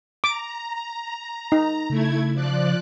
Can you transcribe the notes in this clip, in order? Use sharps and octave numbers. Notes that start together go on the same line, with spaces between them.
A#5 D6
D#4
C#3 A3 E4 G#6
F3 D5 F#6